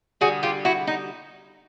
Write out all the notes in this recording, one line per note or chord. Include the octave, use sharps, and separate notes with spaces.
D3 G3 F#4 G#4
F4 G4
E4 F#4
D#4